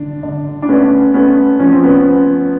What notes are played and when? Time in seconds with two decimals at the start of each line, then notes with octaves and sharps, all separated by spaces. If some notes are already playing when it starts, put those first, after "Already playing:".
Already playing: D3 D4
0.23 D3
0.62 D4
0.69 A3 B3 C#4
1.14 A3 B3 C#4
1.59 F3 C#4
1.72 C4
1.84 B3 C#4